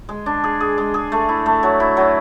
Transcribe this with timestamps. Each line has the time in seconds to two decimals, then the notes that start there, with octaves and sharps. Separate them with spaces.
0.09 G#3
0.26 D4
0.44 G#4
0.61 G#4
0.78 G#3
0.94 G#4
1.12 A3
1.29 E4
1.46 A3
1.63 F#3
1.80 E4
1.97 F#3